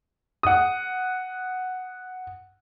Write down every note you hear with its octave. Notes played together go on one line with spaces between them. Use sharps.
F#5 D#6